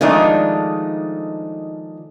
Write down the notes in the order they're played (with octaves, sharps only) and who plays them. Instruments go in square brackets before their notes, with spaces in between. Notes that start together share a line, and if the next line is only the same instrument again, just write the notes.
[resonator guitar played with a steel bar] D#3 F3 G#3 A3 D4 D#4